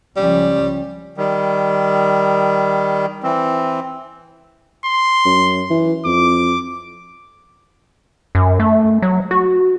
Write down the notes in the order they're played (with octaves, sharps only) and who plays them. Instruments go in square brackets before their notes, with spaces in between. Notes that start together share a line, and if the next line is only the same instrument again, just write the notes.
[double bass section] C#2 F3 C#4 [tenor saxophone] G3
[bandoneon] D#3 G3
E3 C4
[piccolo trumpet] C6
[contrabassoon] F#2
E3
[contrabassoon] F2 [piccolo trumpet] D6
[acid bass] F#2
A3
F#3
F#4